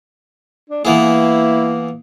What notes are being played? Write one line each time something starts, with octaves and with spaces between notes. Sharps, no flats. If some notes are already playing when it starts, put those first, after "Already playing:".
D4
E3 A#3 B3 E4 G#4